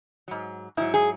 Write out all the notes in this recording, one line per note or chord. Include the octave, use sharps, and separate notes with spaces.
G#2 F#3
G#2 F#3 E4
G#4